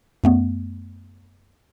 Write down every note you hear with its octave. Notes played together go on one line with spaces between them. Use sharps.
F#2 A3 B3